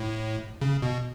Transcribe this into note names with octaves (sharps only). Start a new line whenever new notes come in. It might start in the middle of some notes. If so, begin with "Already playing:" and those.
Already playing: A2
C#3
B2